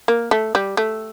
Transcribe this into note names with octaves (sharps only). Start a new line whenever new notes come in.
A#3
A3
G3
A3